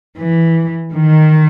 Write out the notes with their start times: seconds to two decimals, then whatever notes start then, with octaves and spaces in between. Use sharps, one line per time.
0.17 E3
0.92 D#3